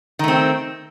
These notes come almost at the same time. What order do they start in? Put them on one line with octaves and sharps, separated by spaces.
D#3 A3 C4